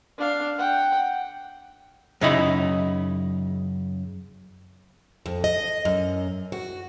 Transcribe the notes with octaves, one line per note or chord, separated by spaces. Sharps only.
D4 F5
F#5 G5
F#2 C#3 D#4 E4 D#5 B5
F2
D#5
F#2
F#4